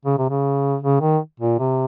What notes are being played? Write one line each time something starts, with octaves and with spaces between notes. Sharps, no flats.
C#3
C3
C#3
C#3
D#3
A#2
C3